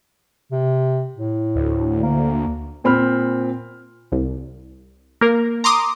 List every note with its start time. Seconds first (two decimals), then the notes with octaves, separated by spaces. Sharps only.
0.51 C3
1.16 A2
1.56 D2
2.03 A#3
2.84 A#2 C4 B5 F6
4.12 C2
5.21 A#3 A#4
5.64 A#5 C6 D6 D#6